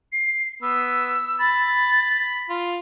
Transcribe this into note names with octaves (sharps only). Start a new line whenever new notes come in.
C7
B3 E6
B5 A6
F4